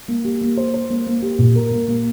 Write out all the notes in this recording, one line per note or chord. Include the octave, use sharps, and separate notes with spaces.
A#3
G4
A#3
C5
C5
A#3
A#3
G4
A#2
A#4
A#3
A#3